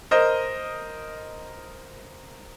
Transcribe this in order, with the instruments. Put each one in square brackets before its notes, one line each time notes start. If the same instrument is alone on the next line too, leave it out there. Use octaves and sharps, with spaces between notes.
[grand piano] A#4 C5 D#5